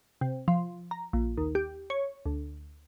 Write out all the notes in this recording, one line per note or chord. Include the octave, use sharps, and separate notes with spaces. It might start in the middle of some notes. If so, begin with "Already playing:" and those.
C3
F3
A#5
A#1
D#2
G4
C#5
D2